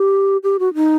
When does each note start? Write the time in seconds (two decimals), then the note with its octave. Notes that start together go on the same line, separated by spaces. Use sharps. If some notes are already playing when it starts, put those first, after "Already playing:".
Already playing: G4
0.43 G4
0.59 F#4
0.75 D#4